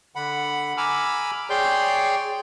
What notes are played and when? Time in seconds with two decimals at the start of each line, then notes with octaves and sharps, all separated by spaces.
0.16 D3 F#5 B5
0.77 G#5 A#5 B5 D6 E6 F6
1.50 G#4 C#5 D5 G5 C6 G6